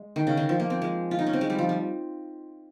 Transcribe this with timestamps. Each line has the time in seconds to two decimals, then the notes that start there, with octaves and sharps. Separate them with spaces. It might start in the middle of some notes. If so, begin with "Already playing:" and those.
Already playing: G#3
0.16 D#3
0.27 C#3
0.37 D#3
0.49 F3
0.60 A#3
0.70 C4
0.82 G#3
1.11 F4
1.19 D#4
1.27 C#4
1.33 C4
1.41 G#3
1.50 G3
1.59 F3
1.69 G3